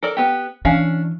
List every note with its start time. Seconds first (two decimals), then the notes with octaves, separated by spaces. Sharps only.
0.03 A4 A#4 D5
0.17 B3 G4
0.65 E3 C#4 D4 F5